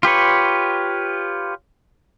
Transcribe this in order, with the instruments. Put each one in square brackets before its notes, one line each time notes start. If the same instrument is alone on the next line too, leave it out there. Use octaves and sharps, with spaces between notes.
[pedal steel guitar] F4 G4 B4 C#5